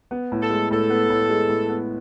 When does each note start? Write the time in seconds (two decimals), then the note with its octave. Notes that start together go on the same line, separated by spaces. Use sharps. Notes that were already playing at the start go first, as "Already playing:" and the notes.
0.11 B3
0.32 A2
0.41 A4
0.50 G#3
0.71 A2 A4
0.90 B3
1.10 A2
1.30 G#3
1.49 A2
1.69 B3